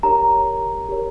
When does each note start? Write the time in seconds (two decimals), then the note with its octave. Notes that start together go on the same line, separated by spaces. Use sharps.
0.03 G4 A#4 C#5 A#5
0.89 G4 A#4 C#5